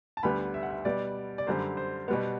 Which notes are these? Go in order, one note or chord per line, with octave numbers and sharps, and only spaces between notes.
A5
D2 D3 G3 B3 B5
E5
F#5
E5
B2 G3 B3 D5
D5
F#2 D3 G3 C5
C5
B2 G3 B3